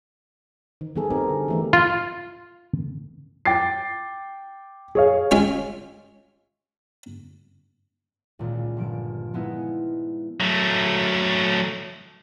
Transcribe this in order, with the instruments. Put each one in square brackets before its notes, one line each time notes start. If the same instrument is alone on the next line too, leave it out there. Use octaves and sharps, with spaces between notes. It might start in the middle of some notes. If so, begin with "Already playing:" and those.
[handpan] D#3
D#3 G3 B3 G#4 A4
C4 D#4 G4 A#4
D3
E3 A3 B3
[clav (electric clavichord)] F4
[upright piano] G5 D6 A6 C7
G#4 C#5 F5
[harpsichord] G#3 C#4 F4 E5 F5 G#5
[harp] C#2 A#2 D#3
G1 F3 D7
F3 G#3 B3 D#4 E4
[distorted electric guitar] F#3 A3